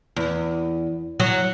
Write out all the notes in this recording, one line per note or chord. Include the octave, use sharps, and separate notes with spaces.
E2
F#3